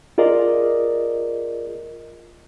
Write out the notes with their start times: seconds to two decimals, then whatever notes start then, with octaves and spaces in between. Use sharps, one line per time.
0.18 F4 G#4 A#4 D5 D#5